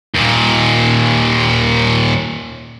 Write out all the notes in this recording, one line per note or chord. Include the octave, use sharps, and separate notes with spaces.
D#2 A#2